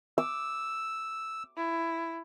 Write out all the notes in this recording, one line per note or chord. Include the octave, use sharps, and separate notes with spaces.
D6 E6
E4